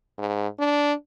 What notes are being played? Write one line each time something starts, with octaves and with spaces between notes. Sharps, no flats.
G#2
D4